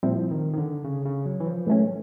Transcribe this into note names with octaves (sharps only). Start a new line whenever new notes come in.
A#2 F3 G3 C4 E4
D#3
D#3
D3
C#3
C#3
F#3
E3
F3
A2 E3 F#3 A3 C#4